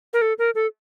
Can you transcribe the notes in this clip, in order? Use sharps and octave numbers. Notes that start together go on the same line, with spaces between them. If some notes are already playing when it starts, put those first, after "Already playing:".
A#4
A4
A#4
A4